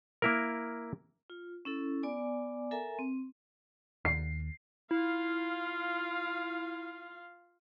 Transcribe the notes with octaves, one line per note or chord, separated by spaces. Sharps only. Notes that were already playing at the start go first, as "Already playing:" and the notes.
A#3 E4 A#4
F4
C#4 E4 A4
B3 D5 G#5 D6
A4 A#4 E5 G#5 A#5
C4
D#2 C7
E4 F4 F5